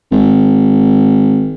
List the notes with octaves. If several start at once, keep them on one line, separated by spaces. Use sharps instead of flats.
G#1